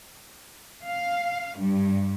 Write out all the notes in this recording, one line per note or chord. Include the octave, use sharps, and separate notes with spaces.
F5
G2